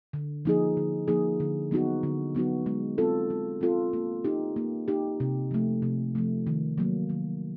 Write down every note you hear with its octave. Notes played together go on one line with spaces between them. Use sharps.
D3
F3 A#3 D#4 G#4
D3
F3 A#3 D#4 G#4
D3
F#3 B3 D#4 F#4
D3
F#3 B3 D#4 F#4
G#3
C4 F4 A4
G#3
C4 F4 A4
A#3
D#4 G4
A#3
D#4 G4
C3
F3 A3
C3
F3 A3
D#3
F#3 A#3
D#3